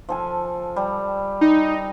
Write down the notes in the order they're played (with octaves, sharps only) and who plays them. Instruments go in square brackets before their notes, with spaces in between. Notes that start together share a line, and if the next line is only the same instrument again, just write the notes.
[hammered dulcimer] F3 A4 G#5
G3
[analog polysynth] D#4